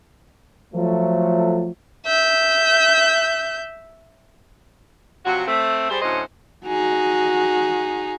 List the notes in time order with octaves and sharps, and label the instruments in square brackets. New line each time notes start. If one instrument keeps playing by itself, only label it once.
[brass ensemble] F3 F#3 A3
[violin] E5 G6
[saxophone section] C3 F3 F#3 F#4
A3 C4
G3 G#4 C5
D2 A2 F#3 C#4 C5 D#5
[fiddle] D#4 G#4 [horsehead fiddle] F#4